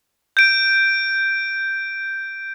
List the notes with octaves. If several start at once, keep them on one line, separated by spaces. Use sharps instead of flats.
G6 D7